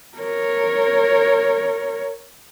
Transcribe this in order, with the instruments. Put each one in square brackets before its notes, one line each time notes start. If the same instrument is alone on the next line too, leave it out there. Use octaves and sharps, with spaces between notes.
[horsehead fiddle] A#4 C#5